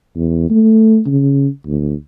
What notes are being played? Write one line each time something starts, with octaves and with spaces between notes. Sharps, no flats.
E2
A3
C#3
D2